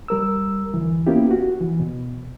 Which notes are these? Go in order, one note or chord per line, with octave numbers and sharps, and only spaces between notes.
G3 A#4 E6
D2 E3
A#3 B3 C#4 E4 F4 G4
F#4
E3
B2